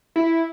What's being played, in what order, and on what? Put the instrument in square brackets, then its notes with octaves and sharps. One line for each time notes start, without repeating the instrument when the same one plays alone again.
[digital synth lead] E4